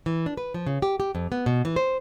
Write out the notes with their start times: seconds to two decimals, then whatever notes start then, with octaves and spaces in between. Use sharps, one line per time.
0.06 E3
0.26 D4
0.37 B4
0.54 F3
0.66 C#3
0.82 G4
1.00 G4
1.15 F2
1.32 B3
1.46 B2
1.65 E3
1.76 C5